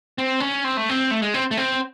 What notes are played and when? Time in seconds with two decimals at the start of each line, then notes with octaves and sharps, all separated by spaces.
0.18 C4
0.40 C#4
0.64 C4
0.77 A3
0.89 C4
1.11 A3
1.22 G#3
1.34 C4
1.51 A3
1.57 C4